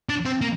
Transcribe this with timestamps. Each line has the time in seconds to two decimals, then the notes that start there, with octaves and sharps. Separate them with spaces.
0.09 D4
0.25 C4
0.41 A#3